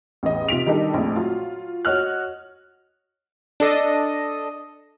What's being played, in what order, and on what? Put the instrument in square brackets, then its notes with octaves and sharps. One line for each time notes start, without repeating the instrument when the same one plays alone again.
[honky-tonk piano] A1 E2 D#5
C3 F4 B6 D7 F7
D#3 G3 D4 D#4 G4 A4
A#1 F2 A3
F#3 F4
F#4 C#5 D#5 F6 F#6
[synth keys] D4 A4 D#5